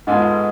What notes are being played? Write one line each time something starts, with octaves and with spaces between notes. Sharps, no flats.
G#2 G#3 B3 F4 A4